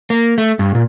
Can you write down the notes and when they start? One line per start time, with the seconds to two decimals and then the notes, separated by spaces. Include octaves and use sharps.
0.10 A#3
0.38 A3
0.59 G2
0.75 A#2